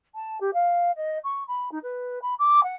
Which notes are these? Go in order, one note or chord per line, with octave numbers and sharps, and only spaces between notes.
A5
G4
F5
D#5
C#6
B5
D#4
B4
B5
D6
F#5